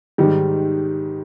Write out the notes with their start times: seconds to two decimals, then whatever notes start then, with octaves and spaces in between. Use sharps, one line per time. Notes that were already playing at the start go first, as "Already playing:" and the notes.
0.18 G#2 D#3 G3